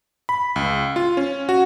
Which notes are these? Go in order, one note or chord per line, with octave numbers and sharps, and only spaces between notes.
B5
C#2
F4
C#4
F#4